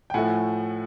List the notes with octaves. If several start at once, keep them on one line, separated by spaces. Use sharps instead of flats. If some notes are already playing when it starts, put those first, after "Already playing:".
G5
A2 F3 A3 F#5 G#5